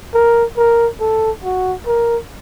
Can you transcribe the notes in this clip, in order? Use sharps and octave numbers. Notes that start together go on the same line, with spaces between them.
A#4
A#4
A4
F#4
A#4